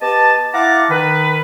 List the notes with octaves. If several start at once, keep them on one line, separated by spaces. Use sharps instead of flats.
B3 G4 D#5 A5
E4 F5 F#5 A5 A#5 D6
D#3 B4